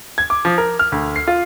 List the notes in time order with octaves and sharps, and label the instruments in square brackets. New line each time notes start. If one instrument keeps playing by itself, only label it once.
[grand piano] G#6
D6
F3
A#4
F6
D2
C7
F4